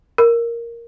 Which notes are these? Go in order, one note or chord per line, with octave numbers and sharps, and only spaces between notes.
A#4